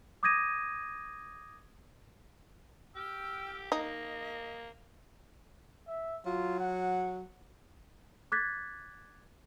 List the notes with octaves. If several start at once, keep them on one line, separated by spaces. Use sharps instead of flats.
D6 D#6 G6 G#6 A#6 D#7
G4 G5 E6 F6
A#3 D#4 D#5
E5
F#3 F4
F#5
D6 F#6 G#6 A6 B6